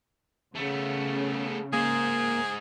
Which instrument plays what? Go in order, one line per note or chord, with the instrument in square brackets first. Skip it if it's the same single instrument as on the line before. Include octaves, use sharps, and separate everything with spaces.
[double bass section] C#3 [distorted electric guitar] A3 B3
[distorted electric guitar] G#3 C5 [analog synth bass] A#3 [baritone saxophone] G#4